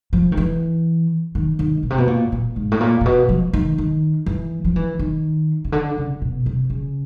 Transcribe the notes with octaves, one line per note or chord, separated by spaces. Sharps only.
F3
D#3
E3
D#3
D#3
B2
C3
B2
A#2
A#2
G#2
A2
A#2
A#2
B2
F3
D#3
D#3
E3
F3
E3
D#3
C#3
D3
C#3
B2
C3
C#3